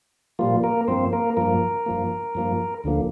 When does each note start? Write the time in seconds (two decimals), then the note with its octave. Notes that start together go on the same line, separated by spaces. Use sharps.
0.39 A#2 F3 G3 A#3 F4
0.64 A#3 A#4
0.88 G2 F3 A#3 C4 C5
1.13 A#3 A#4
1.37 G2 F3 A#3 A#4
1.86 G2 F3 A#3
2.35 G2 F3 A#3
2.84 D2 D3 F3 A#3